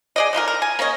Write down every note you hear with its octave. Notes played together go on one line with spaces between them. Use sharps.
G#4 D5 D#5
D3 F3 D#4 A#4
A#4
G#5
A#3 C#4 C#5 D#5